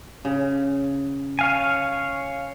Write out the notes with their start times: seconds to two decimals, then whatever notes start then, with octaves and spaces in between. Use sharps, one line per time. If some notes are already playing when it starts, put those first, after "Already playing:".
0.25 C#3
1.39 C#5 F5 G#5